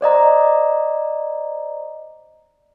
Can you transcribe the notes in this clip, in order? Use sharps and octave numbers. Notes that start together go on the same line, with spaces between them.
C5 D5 D#5 A#5